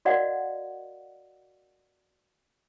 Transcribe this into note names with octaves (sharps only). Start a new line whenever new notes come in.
F#4 A#4 D5 D#5 F5 F#5